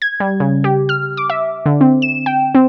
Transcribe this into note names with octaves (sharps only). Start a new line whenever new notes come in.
G#6
G3
C#3
G4
F6
D6
E5
D3
C4
E7
G5
C4